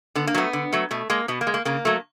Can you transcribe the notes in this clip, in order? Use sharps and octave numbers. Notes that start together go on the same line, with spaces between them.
D3 B3
A#3
F#3 A3 B3
D3
F#3 A3
B2 A3
G#3 A#3
B2 B3
A#3
G#3
A#3
C#3 A#3
F#3 A3